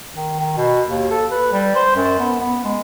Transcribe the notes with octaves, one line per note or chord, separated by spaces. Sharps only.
D#3
D#3
B2
D#2
A4
B4
G3
C5
F#2
B3
B3
G#3